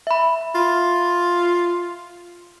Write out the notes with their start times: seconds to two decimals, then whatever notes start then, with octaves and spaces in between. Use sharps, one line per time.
0.07 E5 B5
0.55 F4